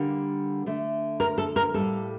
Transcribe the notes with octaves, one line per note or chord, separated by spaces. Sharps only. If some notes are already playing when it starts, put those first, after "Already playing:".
Already playing: D3 G3 A#3
D3 A3
A#4
A4
A#4
A2 G3 A#3 A4